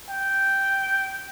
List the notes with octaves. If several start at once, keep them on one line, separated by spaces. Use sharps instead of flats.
G5